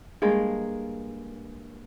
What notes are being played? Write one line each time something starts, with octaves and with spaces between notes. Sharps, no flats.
G2 G#3 A#3